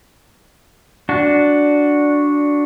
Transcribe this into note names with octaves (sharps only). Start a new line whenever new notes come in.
D4 F#4